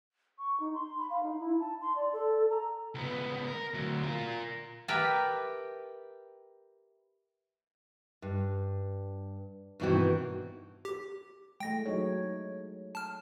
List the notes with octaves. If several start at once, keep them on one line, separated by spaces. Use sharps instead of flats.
C#6
D#4
C6
B5
F5
D#4
E4
A5
C6
D5
A4
A#5
C#2 B3
A#4
D2 F#3
F4 A#4
G4 A#4 B4 E5 G5 A5
G2
G2 B2 D#3 E3 C4 F#4
G4
G#3 A3 G5 A#6
F#3 D#4 C#5
A5 F6